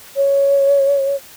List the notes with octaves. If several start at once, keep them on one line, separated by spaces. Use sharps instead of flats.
C#5